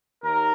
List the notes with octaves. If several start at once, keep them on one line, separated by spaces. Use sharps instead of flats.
D#2 A#4